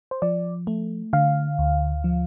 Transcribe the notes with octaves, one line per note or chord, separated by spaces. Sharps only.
C5
F3 D5
A3
D3 F5
D2
F3